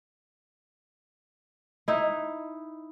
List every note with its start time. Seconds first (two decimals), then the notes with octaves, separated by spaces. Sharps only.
1.88 D#4 E4